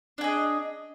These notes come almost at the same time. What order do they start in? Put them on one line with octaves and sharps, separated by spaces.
D4 G#4 D#5